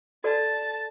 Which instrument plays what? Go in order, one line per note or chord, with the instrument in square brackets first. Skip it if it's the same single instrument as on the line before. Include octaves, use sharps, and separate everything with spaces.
[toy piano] F#4 A4 D5 [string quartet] A5